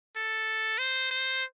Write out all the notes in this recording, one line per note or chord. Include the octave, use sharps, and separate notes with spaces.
A4
C5
C5